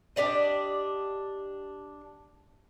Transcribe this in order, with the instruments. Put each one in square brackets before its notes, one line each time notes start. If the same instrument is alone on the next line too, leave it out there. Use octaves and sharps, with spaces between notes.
[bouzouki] D4 G4 D5 D#5